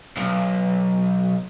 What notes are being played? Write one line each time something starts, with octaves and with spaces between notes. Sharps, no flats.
B1